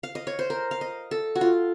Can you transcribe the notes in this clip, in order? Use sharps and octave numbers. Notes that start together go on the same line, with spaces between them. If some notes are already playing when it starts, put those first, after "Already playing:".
F5
D#5
C#5
C5
A#4
F5
D#5
A4
F#4
F4